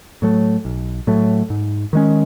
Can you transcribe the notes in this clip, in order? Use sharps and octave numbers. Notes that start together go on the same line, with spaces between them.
A2 F#3 A3
B1
A2 F#3 A3
G#2
D#3 G#3 C#4